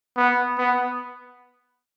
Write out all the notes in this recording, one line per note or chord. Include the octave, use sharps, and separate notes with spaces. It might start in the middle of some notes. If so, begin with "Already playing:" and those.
B3
B3